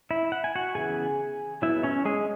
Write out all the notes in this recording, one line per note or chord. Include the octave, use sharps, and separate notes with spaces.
E4 E5
F#5
G#5
F#4 F#5
C#3 E3 B3 G#4 G#5
F#3 B3 E4 E5
C#4 C#5
G#3 G#4